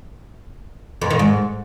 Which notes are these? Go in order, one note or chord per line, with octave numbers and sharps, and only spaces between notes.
F2
D#3
G#2